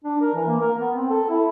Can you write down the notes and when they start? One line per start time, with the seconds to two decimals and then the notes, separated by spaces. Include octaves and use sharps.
0.05 D4
0.21 A#4
0.35 E3
0.47 A#3
0.61 A#4
0.80 B3
0.95 C4
1.10 A4
1.29 E4